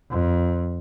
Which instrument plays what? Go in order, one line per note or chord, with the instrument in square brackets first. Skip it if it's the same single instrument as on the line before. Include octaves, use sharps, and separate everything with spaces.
[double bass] F2